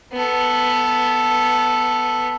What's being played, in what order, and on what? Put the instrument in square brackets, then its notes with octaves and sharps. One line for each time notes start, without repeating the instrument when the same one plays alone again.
[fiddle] B3 A4